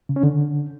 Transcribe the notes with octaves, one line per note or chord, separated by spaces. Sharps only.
C#3
C#4
D3